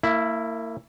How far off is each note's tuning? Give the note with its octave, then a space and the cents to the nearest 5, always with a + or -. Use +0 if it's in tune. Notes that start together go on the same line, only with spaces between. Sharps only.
A#3 -35 E4 +0